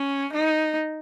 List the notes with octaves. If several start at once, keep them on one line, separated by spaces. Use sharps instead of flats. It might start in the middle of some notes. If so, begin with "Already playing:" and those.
Already playing: C#4
D#4